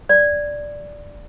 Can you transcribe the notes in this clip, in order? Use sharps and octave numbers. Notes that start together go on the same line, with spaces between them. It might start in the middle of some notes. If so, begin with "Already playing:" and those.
D5